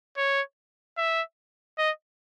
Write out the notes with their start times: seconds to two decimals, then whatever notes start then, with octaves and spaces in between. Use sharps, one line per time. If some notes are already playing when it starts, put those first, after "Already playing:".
0.17 C#5
0.97 E5
1.78 D#5